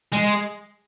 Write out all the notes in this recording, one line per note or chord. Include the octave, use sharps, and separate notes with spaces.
G#3